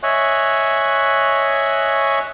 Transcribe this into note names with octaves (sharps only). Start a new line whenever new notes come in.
C#5 D#5 E5 G#5 C#6 F#6